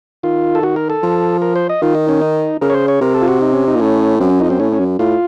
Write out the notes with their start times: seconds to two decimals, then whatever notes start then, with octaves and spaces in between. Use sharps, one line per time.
0.23 D#3 F4
0.55 A4
0.63 F#4
0.76 A#4
0.90 A4
1.03 F3
1.42 A#4
1.56 C5
1.69 D#5
1.82 D#3 F4
1.95 D#4
2.09 C#4
2.22 D#4
2.61 C#3 A#4
2.70 C#5
2.74 C5
2.88 C#5
3.01 C3 A#4
3.14 A4
3.22 F4
3.28 F#4
3.41 D#4
3.53 C#4
3.68 D#4
3.76 A#2
3.80 A2 C#4
4.20 F#2 C4
4.30 C#4
4.39 F2 D#4
4.50 F#2 C4
4.60 A2 C#4
4.72 C#4
4.79 F#2
4.99 A2 F4